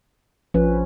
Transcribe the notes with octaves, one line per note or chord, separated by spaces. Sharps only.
A#1 F3 C#4 B4